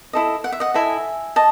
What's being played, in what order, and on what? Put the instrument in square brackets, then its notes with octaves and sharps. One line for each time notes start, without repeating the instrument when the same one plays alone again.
[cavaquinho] E4 A4 D#5
F#5
E5
D#5 F#5
E4 A4 D#5 E5 G#5
D#5 A5